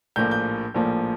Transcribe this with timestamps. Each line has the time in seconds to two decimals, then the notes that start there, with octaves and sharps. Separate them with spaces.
0.16 A#1 A2 F3 A#3 G6
0.31 G6
0.75 A#1 A2 F3 A#3